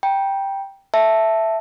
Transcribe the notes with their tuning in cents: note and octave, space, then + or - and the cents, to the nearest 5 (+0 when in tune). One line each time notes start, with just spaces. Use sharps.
G5 +0 A#5 +45
E5 +0 A5 +0